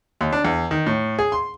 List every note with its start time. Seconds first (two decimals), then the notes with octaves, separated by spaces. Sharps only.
0.21 D#2
0.33 D4
0.45 E2
0.71 D#3
0.86 A2
1.19 G#4
1.32 C6